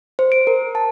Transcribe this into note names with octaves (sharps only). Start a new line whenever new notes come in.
C5
D7
A#4
A5